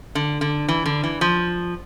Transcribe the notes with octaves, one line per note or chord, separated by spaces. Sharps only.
D3
D3
E3
D3
E3
F3